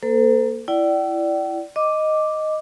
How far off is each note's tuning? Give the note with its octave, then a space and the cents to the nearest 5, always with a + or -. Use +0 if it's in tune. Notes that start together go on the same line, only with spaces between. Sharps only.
A#3 +0 A4 +20 C5 -40
E4 +20 D5 +0 G5 -45
D#5 +0 D6 +0